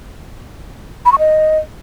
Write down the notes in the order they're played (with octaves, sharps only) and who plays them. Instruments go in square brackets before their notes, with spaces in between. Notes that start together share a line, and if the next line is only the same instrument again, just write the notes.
[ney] B5
C#6
D#5